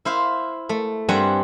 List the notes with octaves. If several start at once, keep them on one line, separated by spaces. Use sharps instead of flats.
E4 C5 F5
A3
G2 G3 C4 F#5 G#5 A#5